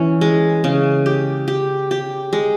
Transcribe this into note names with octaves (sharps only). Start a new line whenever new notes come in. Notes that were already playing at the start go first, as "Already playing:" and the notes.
Already playing: E3 C#4
G#3
C#3
G4
G4
G4
G#3